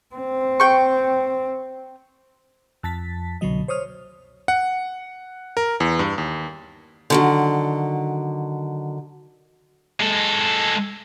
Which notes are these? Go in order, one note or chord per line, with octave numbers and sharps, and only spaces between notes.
C4
G5 C#6
F2 A5 A6 B6
C2 B2 D3 F#3 D#5
C5 C#5 D#6 F6
F#5
A#4
E2
G2
D#2
D3 D#3 F#3
G#3 A4